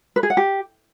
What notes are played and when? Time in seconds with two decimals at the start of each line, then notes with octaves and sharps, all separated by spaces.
0.16 B4
0.23 G#4
0.30 F#5
0.37 G4